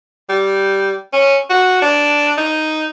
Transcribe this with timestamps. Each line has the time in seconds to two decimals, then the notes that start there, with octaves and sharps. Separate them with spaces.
0.29 G3
1.13 C#4
1.50 F#4
1.82 D4
2.38 D#4